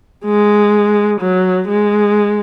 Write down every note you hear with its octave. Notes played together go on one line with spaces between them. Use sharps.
G#3
F#3
G#3